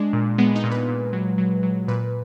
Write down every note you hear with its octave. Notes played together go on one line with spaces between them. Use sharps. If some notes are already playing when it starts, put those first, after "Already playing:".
Already playing: G#3 D4
A#2
G#3 B3
D#4
A#2
B4
A#2
F#3
F#3
F#3
A#2 B4